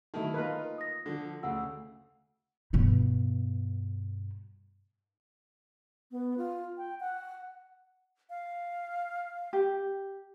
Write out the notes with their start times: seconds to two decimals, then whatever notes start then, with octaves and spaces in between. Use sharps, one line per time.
0.14 D3 D#3 F#3 A3 D#4 E4 A5
0.34 A#3 D#4 F4 A#4 B4
0.78 D#6 A#6
1.06 D3 F3
1.43 D2 C#3 A4 F#5 E6
2.73 G2 B2
6.11 B3
6.38 F4
6.78 G5
7.00 F#5
8.30 F5
9.53 G4